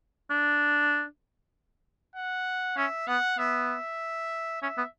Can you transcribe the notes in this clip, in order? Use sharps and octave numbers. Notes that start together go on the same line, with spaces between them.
D4
F#5
C#4 E5
B3 F#5
B3 E5
C#4 E5
B3